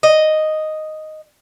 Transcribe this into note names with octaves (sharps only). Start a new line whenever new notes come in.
D#5